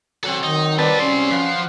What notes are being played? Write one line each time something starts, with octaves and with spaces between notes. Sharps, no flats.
F#3 C4 A4 F#5
D#3 D#4
G3 C4 B4 D5 A5
C#4 C6
F3 B4 F5 F#5